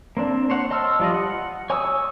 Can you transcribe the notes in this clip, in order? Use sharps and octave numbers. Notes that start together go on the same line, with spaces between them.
A#3 C4 D4
C5 C#5 F#5
D#5 A5 C6 E6 F6
F3 G3 F4 D5 D#5
F#5
C#5 G#5 C#6 D#6 E6